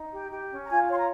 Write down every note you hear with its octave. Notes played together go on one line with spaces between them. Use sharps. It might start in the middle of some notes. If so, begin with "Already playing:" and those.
Already playing: D#4
G4
G4
C#4
A#5
F4 G#5
C#5 C6
A#5